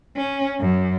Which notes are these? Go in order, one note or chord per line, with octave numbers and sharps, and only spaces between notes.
C#4
F#2